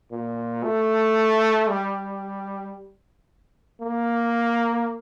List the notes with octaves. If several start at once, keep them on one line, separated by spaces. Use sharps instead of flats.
A#2
A3
G3
A#3